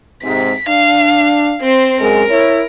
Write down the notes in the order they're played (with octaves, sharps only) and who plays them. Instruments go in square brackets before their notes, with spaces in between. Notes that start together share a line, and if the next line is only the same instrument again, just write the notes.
[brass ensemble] G#2 C3 [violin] B6
[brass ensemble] D4 [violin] F5
[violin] C4 C5
[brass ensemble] F#2 G#3 [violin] A#4
[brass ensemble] E4 C#5